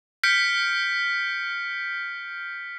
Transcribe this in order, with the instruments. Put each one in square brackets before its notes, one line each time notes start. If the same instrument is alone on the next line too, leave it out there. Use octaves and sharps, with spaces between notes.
[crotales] F6 G6 B6 C#7 D7